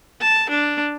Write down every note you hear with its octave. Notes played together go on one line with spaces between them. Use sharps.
A5
D4